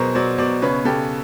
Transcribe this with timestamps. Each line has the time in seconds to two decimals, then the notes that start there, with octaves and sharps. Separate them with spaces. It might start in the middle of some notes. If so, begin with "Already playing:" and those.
Already playing: B2 F#3 G#4 A#4 C5
0.15 F#3 C5 D5
0.38 B2 C5 D5
0.62 C#3 B4 C#5
0.85 C#3 G4 A4